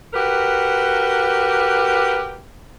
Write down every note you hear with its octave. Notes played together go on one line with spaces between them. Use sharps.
F#4 G4 A#4 B4